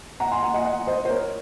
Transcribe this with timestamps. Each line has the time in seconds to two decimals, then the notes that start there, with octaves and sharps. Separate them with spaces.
0.20 F#5 A#5
0.31 G#5 C6
0.43 F#5 A#5
0.54 D#5 F#5
0.65 D#5 F#5
0.87 C5 D#5
1.05 C5
1.10 A#4 C#5